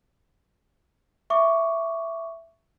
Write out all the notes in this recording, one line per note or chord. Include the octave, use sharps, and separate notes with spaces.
E5 C#6 D6